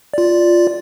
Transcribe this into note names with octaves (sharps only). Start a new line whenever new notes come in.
F4 D5